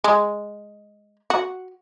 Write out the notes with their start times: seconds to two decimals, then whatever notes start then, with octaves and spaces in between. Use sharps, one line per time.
0.04 G#3
1.30 F#4